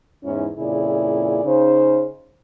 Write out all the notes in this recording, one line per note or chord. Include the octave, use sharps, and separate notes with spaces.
E2 G#2 C#4 E4
F2 A#2 C#3 E4 G#4 D5
C#3 D#4 C5